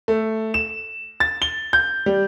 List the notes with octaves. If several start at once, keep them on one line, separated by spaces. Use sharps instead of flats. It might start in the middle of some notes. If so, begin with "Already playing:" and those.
A3
E7
A6
G7
G6
G3